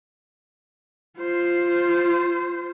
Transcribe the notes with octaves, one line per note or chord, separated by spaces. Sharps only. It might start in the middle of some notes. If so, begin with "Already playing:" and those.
F4 C5